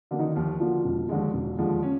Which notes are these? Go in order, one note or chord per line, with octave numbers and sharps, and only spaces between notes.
D3 F#3 A#3
D#3 D#4
D#2 F3 F4
D3 F3 F#3 A#3 F4
E1
D#2 D3 F3 G#3
E1
D#2 D3 F3 G#3
C#4